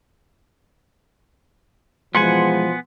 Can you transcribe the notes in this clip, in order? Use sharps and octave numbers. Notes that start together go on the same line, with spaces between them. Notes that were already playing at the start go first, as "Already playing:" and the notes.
B2 E3 F3 G#3 B3 F#5 G#5 C6